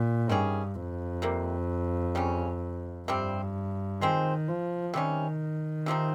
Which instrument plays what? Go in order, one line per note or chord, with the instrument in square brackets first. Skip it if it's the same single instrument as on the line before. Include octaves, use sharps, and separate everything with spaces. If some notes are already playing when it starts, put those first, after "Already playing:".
Already playing: [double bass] A#2
[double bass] G2 [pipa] D#3 G3 C#4 G#4
[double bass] F2
[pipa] C3 G3 A#3
C#3 G3 C#4
[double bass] G2 [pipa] C3 G3 C4
[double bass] D#3 [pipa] F3 G#3 C4
[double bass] F3
[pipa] C3 G3 C#4 [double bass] D#3
[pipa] C3 F3 C4 D#4